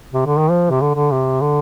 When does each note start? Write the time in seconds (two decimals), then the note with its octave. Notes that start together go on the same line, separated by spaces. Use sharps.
0.13 C3
0.26 D3
0.38 D#3
0.50 F3
0.70 C3
0.81 D3
0.95 D3
1.11 C3
1.41 D3